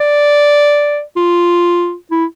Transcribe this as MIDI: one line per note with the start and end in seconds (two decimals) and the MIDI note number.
0.01 1.02 74
1.17 1.95 65
2.11 2.25 64